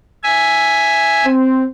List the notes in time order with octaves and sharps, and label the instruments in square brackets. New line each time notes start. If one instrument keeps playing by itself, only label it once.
[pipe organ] E5 G#5
[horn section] C4